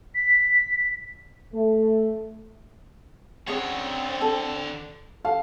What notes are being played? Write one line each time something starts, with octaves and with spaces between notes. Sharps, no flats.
B6
A3
D3 C4 C#4 G#4 C#5 F#5
A4
A4 F5